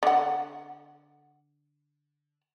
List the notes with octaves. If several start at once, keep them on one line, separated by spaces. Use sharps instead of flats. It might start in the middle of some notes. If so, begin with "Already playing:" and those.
D3 F#5